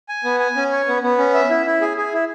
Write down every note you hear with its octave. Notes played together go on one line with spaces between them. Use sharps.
G#5
B3
G#5
C#4
C#5
B3
B3
C#4
E5
E4
E4
G#4
G#4
E4